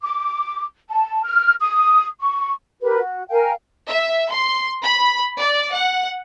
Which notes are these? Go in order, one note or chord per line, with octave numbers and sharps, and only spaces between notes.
D6
A5
F6
D#6
C#6
G4 A#4 B4
F#4
A#4 F5 G5 G#5
E5
C6
B5
D5
F#5